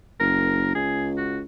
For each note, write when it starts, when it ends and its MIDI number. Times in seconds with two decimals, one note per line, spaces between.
0.20 0.72 30
0.20 0.73 70
0.75 1.43 37
0.75 1.06 68
1.17 1.38 66